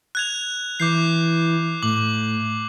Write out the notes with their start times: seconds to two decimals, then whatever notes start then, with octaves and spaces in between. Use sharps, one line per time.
0.15 F#6 G#6 F7
0.80 E3 D6 G6 C7
1.83 A2 D6 F#7